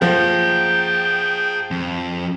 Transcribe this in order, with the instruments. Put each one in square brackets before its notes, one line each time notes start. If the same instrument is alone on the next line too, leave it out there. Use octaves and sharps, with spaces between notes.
[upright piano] F3 [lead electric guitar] G#4 F#5 [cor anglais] G5
[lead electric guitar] F2